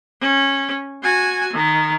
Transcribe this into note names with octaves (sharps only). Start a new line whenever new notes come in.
C#4
F#4 G#5
D#3